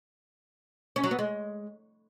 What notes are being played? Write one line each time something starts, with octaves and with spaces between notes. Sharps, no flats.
C#4
F#3
B3
G#3